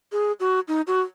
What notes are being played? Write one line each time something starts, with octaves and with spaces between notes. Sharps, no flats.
G#4
F#4
D#4
F#4